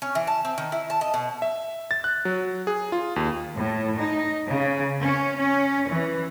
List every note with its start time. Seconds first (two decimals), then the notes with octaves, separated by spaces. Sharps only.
0.02 C#4
0.15 E3
0.27 A5
0.45 C4
0.58 D#3
0.72 E4
0.90 A5
1.01 D#5
1.14 B2
1.42 E5
1.91 A6
2.04 F#6
2.25 F#3
2.67 G#4
2.92 F4
3.16 D#2
3.55 A2
3.98 D#4
4.47 C#3
5.01 C#4
5.38 C#4
5.87 E3